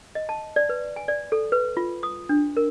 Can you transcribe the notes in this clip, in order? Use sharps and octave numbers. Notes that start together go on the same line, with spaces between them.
D#5
A5
D5
B4
G#5
D5
A4
B4
F4
D#6
D4
A#4